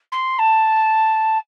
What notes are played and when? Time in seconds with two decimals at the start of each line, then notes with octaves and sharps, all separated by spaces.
0.12 C6
0.39 A5